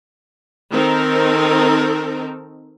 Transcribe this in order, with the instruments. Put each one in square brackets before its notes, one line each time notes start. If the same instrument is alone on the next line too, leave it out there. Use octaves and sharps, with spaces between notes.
[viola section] D#3 C4 D#4 A4 A#4